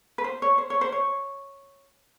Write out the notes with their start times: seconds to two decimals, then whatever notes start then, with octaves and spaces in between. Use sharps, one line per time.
0.18 B4
0.24 C5
0.42 C#5
0.58 C5
0.70 C#5
0.81 C5
0.92 C#5